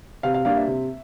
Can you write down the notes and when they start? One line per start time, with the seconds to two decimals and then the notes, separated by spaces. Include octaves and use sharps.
0.23 C3 F5
0.34 F5
0.45 G3 A#3 D4 F5
0.56 E5
0.67 C3